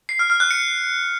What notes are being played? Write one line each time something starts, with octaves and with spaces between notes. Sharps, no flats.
C7
F6
F6
F#6
C#7